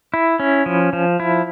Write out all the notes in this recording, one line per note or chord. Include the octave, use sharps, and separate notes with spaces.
E4
C#4
F3
F3
E4